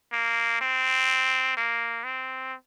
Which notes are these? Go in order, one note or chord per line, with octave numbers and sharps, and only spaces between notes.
A#3
C4
A#3
C4